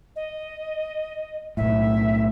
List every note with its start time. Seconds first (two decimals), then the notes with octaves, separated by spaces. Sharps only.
0.16 D#5
1.57 B1 A2 E5